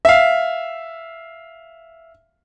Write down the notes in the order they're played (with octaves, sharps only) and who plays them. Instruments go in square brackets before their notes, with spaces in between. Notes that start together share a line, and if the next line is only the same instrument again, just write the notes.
[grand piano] E5 F5